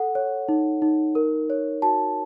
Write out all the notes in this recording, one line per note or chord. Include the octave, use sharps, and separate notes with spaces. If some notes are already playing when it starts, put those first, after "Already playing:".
Already playing: A4 F#5
C#5
D#4
D#4
A#4
C#5
F#4 A5